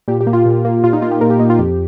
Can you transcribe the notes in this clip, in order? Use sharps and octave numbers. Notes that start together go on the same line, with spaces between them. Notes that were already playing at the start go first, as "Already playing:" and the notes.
A#2 G4
G4
A#3
F4
A#2
A#3
A#2 F4
D#4
A#3 F4
G4
A#2 A#4
G4
A#3 D#4
F4
F2 G4